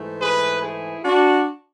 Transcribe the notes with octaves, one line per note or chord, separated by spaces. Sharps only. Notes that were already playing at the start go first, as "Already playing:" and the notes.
Already playing: G#2 E3 A3
G#4 B4
E4 G#4
D4 F#4